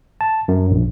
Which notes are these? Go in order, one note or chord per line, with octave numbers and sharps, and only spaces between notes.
A5
F#2
A#1